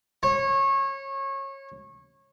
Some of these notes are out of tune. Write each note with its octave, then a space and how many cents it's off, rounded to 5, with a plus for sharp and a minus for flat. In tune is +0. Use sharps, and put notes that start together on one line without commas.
C#5 -25